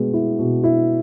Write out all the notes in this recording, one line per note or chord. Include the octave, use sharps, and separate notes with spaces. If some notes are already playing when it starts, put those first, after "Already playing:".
Already playing: B2 G#3 B3
E4
B2
E4